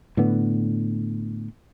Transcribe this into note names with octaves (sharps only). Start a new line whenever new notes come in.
A2 D3 B3